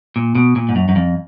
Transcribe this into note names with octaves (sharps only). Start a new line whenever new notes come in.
A#2
B2
A#2
G#2
F#2
F#2
F2